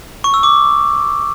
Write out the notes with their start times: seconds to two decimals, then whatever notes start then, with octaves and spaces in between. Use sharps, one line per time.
0.24 C#6
0.34 E6
0.43 D6